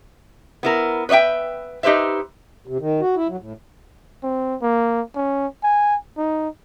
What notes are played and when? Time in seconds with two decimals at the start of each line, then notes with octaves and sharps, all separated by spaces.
0.63 B3 E4 A#4
1.09 B4 C#5 D#5 E5 G5
1.83 D#4 G4 B4 C5 E5
2.67 C3
2.80 D#3
3.01 F#4
3.16 E4
3.29 F#3
3.41 A2
4.23 C4
4.62 A#3
5.15 C#4
5.63 G#5
6.17 D#4